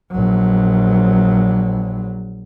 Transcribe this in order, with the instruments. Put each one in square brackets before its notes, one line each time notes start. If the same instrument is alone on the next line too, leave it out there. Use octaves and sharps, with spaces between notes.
[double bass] A#1 F#3